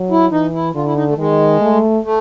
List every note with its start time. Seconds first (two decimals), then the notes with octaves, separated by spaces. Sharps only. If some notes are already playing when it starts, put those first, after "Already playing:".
Already playing: F#3
0.11 E4
0.31 E3 D#4
0.54 E4
0.75 D3 F4
0.85 E4
0.96 D#4
1.07 A3
1.18 D#3 G#3
1.61 A3
2.04 A3